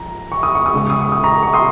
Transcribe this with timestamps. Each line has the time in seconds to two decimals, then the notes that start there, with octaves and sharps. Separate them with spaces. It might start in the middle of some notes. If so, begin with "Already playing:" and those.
Already playing: F3 A#5
0.32 C#6
0.43 D#6
0.55 C#6
0.66 D#6
0.73 C#3 G#3 C#6
0.90 D#6
1.01 C#6
1.12 D#6
1.23 A#5 C#6
1.43 C#6
1.53 C6 D#6